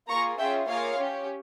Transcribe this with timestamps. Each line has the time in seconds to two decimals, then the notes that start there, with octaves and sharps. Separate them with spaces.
0.08 A#3 F4 G#4 A#5 C#6
0.38 C#4 F4 G#4 E5 G5
0.67 A#3 F4 G#4 C#5 F5
0.97 C#4 G4